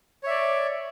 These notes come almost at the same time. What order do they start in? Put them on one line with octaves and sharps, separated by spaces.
C#5 E5 D5